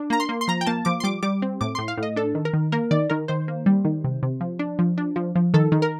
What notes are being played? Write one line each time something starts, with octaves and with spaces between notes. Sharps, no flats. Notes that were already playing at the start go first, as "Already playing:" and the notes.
Already playing: D4
A#3 A#5
C6
A#3
C6
F3 A#5
G5
A#3 A5
F3 D6
C6
G3 D6
G3 D6
C4
A2 D6
A2 C6
F5
A2
D#5
D4 A4
D#3
A#4
D#3
A#3 A#4
D#3 D5
D#3 A#4
D#3 C5
A#3
G3
D#3
C3
C3
F3
D4
F3
D4
F3
F3
D#3 A4
D#3
A#4